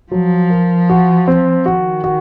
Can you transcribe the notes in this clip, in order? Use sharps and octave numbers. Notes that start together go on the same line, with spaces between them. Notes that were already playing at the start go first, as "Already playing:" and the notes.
F3 F#3
A#4
F#4
C4
D#3 F#4
F#4